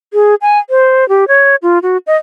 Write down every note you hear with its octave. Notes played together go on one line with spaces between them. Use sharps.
G#4
G#5
C5
G4
C#5
F4
F#4
D#5